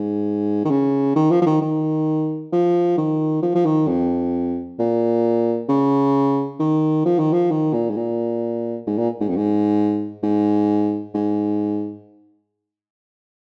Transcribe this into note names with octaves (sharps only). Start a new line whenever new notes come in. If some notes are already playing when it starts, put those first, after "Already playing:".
Already playing: G#2
D#3
C#3
D#3
F3
F3
D#3
D#3
F3
D#3
F3
F3
D#3
F2
A#2
C#3
D#3
F3
D#3
F3
D#3
A#2
G#2
A#2
G#2
A#2
G#2
F2
G#2
G#2
G#2